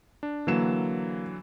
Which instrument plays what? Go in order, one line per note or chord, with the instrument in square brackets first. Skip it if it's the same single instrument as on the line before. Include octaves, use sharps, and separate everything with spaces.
[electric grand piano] D4
[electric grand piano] D3 E3 F#3 [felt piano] A#3 E7